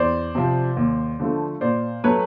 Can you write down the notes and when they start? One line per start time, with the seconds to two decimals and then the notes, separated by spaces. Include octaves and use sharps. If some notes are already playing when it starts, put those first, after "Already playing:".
Already playing: E2 C5 D5
0.35 C3 F3
0.77 D#2
1.20 D3 F3 A3
1.61 A#2 C5 D5
2.04 F#3 A3 B4 C#5